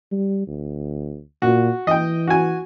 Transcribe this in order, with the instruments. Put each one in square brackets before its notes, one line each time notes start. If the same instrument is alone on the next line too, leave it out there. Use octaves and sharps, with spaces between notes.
[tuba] G3
D2
[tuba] A#2 [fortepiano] F#4
[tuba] E3 [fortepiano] D#5 G5
[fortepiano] F#4 G#5